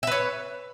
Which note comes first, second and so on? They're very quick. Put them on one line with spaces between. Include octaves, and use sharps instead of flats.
E5 B4 C#5